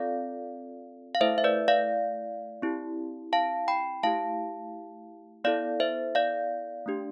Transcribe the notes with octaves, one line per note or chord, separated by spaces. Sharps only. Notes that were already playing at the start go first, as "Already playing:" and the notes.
Already playing: C4 F4 A4 D5 F5
F5
A3 E4 A4 C5 E5
E5
B4 D5
D5 F5
C4 E4 G4
F5 A5
G5 B5
A3 E4 G4 F5 A5
B3 E4 A4 D5 F5
C5 E5
D5 F5
A3 D4 G4